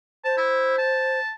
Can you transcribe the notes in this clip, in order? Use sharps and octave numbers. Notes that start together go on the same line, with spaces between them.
C5 A5
E4
A5